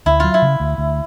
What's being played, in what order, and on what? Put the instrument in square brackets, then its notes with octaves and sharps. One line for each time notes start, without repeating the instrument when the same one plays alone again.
[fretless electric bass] D2 [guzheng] E4
[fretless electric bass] F#3 [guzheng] F4
[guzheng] E4
[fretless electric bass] C#3
D2
D2